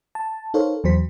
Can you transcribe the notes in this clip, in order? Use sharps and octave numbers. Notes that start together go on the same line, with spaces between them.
A5
D#4 A4 A#4 C5 C#5 F5
E2 F#3 C5 B6